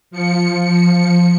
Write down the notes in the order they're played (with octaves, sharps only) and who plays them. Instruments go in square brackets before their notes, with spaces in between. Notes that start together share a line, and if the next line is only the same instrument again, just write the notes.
[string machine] F3 C#7